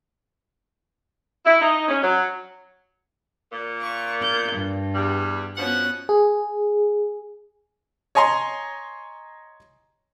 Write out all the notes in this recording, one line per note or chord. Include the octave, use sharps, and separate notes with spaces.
E4
D#4
C#4
F#3
A#2
C#6
G6
G2
E2 G3
B2 F3 B3 C#4 F#5 F#6
G#4
C#5 D#5 G#5 A#5 C6